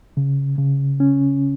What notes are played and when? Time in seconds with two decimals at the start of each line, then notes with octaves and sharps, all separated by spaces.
0.17 C#3
0.58 C#3
1.00 C#4